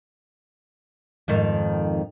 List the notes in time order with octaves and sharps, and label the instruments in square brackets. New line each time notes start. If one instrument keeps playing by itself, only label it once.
[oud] F2 G#2 D#3